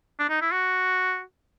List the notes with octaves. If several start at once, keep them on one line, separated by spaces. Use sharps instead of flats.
D4
D#4
E4
F#4